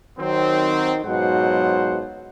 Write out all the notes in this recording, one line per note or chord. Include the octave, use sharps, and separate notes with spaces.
D#3 F#3 C4
G#2 B2 F#3 F4 C5 F#5